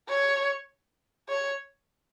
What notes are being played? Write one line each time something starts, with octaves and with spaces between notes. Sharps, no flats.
C#5
C#5